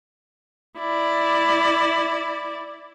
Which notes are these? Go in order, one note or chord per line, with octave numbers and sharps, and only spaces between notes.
E4 D5